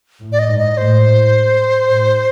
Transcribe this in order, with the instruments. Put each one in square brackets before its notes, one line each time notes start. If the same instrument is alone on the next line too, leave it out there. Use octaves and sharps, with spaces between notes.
[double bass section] A2
[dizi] D5
D#5
[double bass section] G#2
[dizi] D#5
[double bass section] A2 [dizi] C5
[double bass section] A2